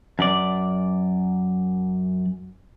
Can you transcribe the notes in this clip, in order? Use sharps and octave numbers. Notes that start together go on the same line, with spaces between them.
F#2 D5